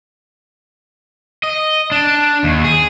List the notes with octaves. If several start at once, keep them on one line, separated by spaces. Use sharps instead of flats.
D#5
D4
D#2
G#4